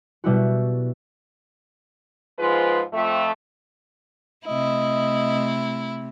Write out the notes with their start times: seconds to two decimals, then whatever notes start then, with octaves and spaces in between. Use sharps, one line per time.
0.24 B2 G3 E4 F#4
2.39 G#2 F3 G#3 F4 B4 C5
2.93 F2 A3
4.47 C3 A3 E4 D#5